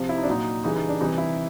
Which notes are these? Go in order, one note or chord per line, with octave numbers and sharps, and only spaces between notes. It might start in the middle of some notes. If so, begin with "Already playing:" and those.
Already playing: C3 F3
E4
D#4
D4
A#2 F#3 D#4
C#3 E3 G3 D#4
D#4
D4
C3 E3 G3 D#4
E4